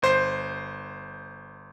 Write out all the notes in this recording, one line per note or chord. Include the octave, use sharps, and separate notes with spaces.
G1 C5 G6 C7